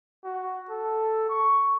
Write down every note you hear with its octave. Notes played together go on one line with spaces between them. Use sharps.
F#4
A4
C#6